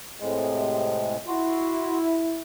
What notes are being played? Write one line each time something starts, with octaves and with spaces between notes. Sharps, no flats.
A2 C3 G#3
E4 F#4 C6